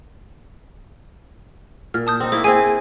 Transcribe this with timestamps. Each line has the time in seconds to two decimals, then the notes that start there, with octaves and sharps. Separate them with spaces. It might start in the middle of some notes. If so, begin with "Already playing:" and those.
1.94 A#2 F6
2.07 A5 D#6 G6
2.20 C4 D#4
2.32 A#3 E4 C5
2.44 C4 E4 G#4 G#5